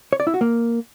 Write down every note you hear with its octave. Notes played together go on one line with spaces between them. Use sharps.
C#5
D5
E4
F#4
A#3